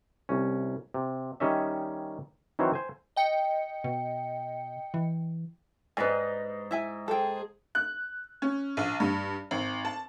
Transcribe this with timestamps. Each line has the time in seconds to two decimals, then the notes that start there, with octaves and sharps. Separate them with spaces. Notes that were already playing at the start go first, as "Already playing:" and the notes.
0.29 C2 C#4
0.94 C3
1.40 D#3 G3 C#4 C#5 D#5 E5
2.59 D#3 E3 F#3 C4 C5 C#5
2.74 C5 G#5
3.16 D#5 G5 C#7
3.84 B2
4.94 E3
5.97 G#2 D#4 B4 D5 G#5
6.71 E4 E5 G#5
7.08 G#4 A4 C5 G5
7.75 F#6
8.42 C#4
8.77 A#1
9.00 G2
9.51 G#1
9.85 A5